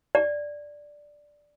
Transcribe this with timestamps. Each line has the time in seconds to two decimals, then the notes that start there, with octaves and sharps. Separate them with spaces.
0.15 D5